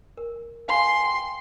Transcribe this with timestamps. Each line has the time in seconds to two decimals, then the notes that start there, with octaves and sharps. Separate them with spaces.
0.17 A#4
0.68 F5 G#5 C6
1.04 G5